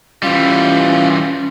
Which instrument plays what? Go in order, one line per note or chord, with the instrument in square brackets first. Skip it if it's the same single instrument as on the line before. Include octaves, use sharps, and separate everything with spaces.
[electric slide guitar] E3 G3 [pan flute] C#4 [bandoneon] F4